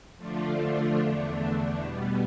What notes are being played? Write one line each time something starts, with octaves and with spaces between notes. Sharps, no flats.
D3 F3 A3 D4 F4
E2 D3 A3 D4
B2 G3 B3